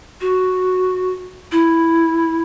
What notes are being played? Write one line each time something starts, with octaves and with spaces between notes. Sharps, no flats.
F#4
E4